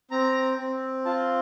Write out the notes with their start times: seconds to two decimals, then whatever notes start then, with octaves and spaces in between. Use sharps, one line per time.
0.11 C4 A#5
0.58 C4
1.05 F4 A5